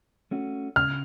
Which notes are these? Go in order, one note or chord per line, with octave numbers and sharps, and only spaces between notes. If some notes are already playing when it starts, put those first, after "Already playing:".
A3 C#4 F#4
C#3 F6